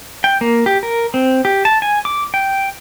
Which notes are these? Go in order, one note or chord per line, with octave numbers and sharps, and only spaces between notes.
G5
A#3
G4
A#4
C4
G4
A5
G#5
D6
G5